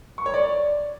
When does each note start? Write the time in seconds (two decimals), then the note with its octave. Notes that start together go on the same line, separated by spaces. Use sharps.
0.18 C#6
0.26 C#5
0.34 D5